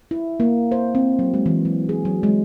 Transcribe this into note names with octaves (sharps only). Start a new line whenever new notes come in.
E4
A#3
C5
C4
F#3
G#3
E3
F#3
G#4
F#3
G#3